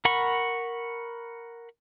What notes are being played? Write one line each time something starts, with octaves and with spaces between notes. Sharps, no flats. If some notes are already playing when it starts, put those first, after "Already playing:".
A#4 F#5 B5 C#6